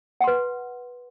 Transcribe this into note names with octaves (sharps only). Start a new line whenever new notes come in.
B4 F#5 C6